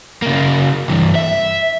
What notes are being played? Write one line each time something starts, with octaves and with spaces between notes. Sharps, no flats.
C#3 A#3
G2 E3
E5